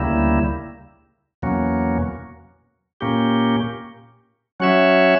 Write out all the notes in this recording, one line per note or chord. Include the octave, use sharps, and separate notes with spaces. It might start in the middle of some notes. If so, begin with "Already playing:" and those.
Already playing: D2 C#3 G3 A#3 E4
E2 B2 F#3 A#3 C#4
A#2 A#3 C#4 G4
F#3 C#4 F#4 C#5 E5